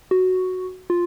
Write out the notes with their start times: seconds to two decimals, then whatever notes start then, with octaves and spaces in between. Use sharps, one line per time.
0.11 F#4
0.90 F4